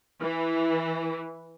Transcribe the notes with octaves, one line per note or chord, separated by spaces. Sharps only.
E3